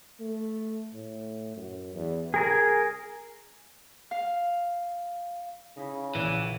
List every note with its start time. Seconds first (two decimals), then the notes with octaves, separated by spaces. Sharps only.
0.20 A3
0.94 A2
1.57 F#2
1.94 E2
2.34 C2 G#4 A#4 G#5
4.11 F5
5.77 C#3 D#4 E4
6.15 A#1 A#2 E3 F#6